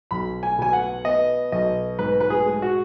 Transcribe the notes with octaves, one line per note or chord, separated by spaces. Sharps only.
B1 B5
G#5
B2 G#5
F#5
B3 D#5
B1 D#5
G#2 B4
B4
G#4
G#3
F#4